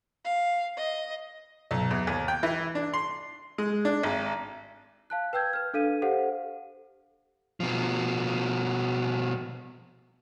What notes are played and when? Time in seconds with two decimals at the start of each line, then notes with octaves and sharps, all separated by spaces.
0.25 F5
0.77 D#5
1.71 B1
1.91 E2
2.07 D#2
2.28 G5
2.43 E3
2.75 D4
2.94 C6
3.58 G#3
3.85 D4
4.03 G#1
5.10 F5 A5 F#6
5.33 B4 G5 E6 G6 G#6
5.53 B4 F6
5.74 D4 A4 F5 D#7
6.02 G4 A4 C5 F5 F#5
7.60 B2 F3